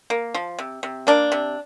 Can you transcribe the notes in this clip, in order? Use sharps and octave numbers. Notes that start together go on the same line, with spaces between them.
A#3
F3
C3
C3
A#3 D4
C3